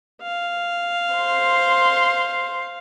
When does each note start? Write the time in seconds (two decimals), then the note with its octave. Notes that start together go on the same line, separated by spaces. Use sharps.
0.22 F5
1.15 C5 C6